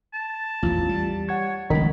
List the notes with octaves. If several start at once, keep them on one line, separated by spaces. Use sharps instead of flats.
A5
A1 E2 F4
G3
C#5 F#5 G#6
F1 C#2 D#3 B5